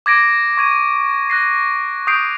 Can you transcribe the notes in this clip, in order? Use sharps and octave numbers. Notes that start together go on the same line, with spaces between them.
D6 G#6 A#6 D7
C#6 G#6 D#7
F#6 A#6 C7
C#6 D#6 G6 C7 D7